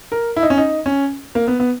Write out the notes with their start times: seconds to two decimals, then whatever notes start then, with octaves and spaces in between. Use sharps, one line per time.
0.12 A#4
0.36 E4
0.43 D#4
0.50 C#4
0.58 D#4
0.86 C#4
1.35 A#3
1.48 B3
1.60 B3